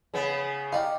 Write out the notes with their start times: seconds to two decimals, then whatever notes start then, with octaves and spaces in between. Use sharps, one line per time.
0.14 C#3 B3
0.72 D#4 G4 D5 F5